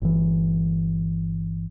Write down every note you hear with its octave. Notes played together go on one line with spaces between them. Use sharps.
G1 E3